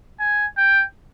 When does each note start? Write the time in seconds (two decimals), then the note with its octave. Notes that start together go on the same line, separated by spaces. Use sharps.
0.20 G#5
0.58 G5